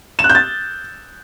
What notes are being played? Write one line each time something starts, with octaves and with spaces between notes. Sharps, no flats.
E7
F#6
G6
A6